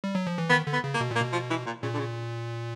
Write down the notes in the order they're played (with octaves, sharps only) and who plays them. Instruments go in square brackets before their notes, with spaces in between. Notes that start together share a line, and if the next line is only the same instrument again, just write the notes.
[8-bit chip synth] G3
F#3
F3
E3
[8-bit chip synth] D#3 [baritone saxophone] B3
[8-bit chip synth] D3
[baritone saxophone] B3
[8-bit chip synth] C#3
[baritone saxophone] A#3
[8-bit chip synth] B2
A#2
[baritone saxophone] A#3
[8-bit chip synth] B2
[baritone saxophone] F3
E3
A#2
[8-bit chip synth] A#2 [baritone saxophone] C#3
[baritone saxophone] D3
C#3